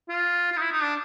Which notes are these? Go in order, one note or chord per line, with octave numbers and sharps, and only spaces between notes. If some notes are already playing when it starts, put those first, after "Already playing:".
F4
F4
D#4
E4
D#4
D4